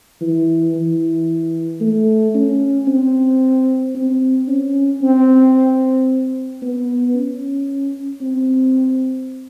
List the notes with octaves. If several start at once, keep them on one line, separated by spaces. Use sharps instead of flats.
E3
E3
A3
C#4
C4
C4
C#4
C4
B3
C#4
C4